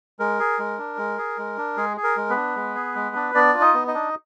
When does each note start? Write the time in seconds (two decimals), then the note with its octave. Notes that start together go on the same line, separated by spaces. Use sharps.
0.19 G#3 A#4
0.39 G#4
0.59 G#3
0.78 D4
0.98 G#3
1.18 G#4
1.38 G#3
1.58 D4
1.77 G#3 G#4
1.97 G#4
2.03 A#4
2.17 G#3
2.30 B3 B4
2.36 D4
2.56 G#3
2.75 G#4
2.95 G#3
3.15 D4
3.35 B3 D4 D5
3.54 F4
3.61 D#4 D#5
3.74 B3
3.88 D#4 D#5
3.94 D4